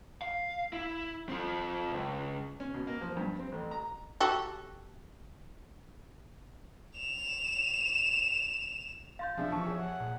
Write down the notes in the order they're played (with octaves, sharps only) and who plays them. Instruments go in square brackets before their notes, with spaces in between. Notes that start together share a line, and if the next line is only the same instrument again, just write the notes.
[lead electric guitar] F5
E4
C4 F4
C#2
[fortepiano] C#4
B2
A#3
F3
G2
C4
A1
A#5
[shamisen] F#4 G4 A4
[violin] E7 F7
[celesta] F5 C6 G6 [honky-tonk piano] A6
[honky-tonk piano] C3 D4 G#4 [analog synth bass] F3 [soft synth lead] E5
[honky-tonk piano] E3 C#6 [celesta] A5
[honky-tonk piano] G#4 C#5
[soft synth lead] F#5
[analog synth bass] A#2